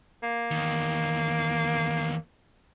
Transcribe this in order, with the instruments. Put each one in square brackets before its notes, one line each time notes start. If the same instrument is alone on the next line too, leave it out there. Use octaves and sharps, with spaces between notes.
[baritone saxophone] A#3
[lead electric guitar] E2 D#3